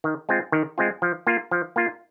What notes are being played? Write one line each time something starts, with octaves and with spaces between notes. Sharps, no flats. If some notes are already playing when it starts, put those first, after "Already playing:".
D#3
G#3 C4 F4
D#3
G#3 C4 F4
F3
A#3 F4
F3
A#3 F4